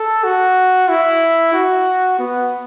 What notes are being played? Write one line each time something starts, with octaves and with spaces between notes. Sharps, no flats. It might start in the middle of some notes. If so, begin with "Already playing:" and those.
Already playing: A4
F#4
E4
F#4
B3